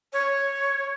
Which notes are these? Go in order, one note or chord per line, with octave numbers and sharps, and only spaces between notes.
C#5